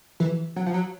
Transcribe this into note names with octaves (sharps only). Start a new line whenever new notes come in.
E3
F#3
F3
F#3